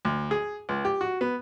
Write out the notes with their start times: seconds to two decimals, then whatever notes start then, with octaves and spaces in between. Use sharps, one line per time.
0.05 D2
0.31 G#4
0.69 C#2
0.85 G4
1.01 F#4
1.21 B3